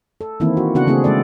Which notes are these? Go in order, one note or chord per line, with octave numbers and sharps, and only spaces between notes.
A4
D#3 E3 A#3 C4 E4
F#4
C#3 B3 D4 F#4 F#5
C#3 A3 C4 D4 E4 G#4
G#3 A4 D5